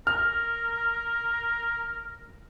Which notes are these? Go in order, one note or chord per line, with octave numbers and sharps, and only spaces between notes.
A#4 F6